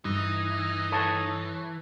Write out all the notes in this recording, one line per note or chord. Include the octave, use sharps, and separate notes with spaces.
G2 E3 D#4
A4 C#5 A5